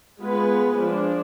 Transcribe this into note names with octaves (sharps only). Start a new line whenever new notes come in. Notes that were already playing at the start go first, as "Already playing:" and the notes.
G#3 B3 F4 G#4 B4
F3 G#3 D4